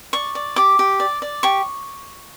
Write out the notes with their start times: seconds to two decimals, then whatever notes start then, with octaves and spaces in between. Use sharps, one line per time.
0.13 D5 C#6
0.35 D5
0.56 G4 D6
0.79 G4
1.00 D5
1.22 D5
1.43 G4 C#6